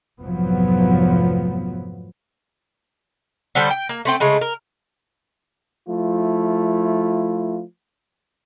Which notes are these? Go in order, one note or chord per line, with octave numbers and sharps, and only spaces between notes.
F1 G#2 F3 F#3 B3
D3 G3 A4 C5
G5
A#3
A3 C4 G5
C#3 G#3 A3
A#4
F3 A3 E4 F4